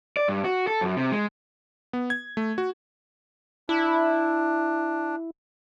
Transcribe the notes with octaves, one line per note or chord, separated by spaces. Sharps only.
D5
G2
F#4
A4
F#2
C3
G#3
B3
G#6
A3
F#4
D4 E4